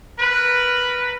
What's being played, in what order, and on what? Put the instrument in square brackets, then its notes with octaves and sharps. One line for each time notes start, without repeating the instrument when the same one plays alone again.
[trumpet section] A#4 B4